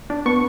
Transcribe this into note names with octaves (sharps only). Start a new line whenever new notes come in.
D4
B3 C#6